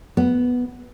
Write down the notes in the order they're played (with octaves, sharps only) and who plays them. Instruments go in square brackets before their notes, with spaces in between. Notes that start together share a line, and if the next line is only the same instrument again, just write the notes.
[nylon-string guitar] B3